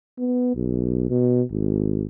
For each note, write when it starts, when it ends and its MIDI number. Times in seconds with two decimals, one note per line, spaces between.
0.18 0.55 59
0.55 1.09 35
1.10 1.42 47
1.51 2.05 32